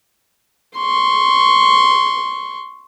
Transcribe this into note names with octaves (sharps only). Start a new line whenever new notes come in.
C6 C#6